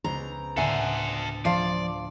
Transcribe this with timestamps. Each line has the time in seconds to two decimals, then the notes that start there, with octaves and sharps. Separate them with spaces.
0.04 C#2 B3 C5 A#5
0.57 D2 A2 D3 A4 C5 E5 F#5 G#5
1.45 F3 F4 D5 F5